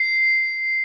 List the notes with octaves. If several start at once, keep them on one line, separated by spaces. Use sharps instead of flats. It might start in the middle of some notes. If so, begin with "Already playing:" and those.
Already playing: C7